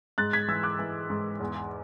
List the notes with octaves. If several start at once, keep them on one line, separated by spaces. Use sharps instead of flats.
G#2 F#6 A6
G#6 B6
E3 E6 G#6
D6 F#6
E3
G#2
E2